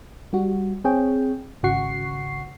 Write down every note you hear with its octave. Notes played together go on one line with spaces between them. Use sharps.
G3 F#4
C4 G#4 C#5 G5
G#1 C#3 F#4 F#5 C#6 C7